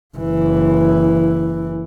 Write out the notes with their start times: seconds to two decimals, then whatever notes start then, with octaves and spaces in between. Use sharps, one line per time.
0.17 F#1 E3